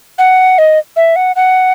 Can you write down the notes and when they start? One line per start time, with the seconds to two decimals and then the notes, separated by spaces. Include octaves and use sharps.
0.18 F#5
0.58 D#5
0.96 E5
1.16 F#5
1.36 F#5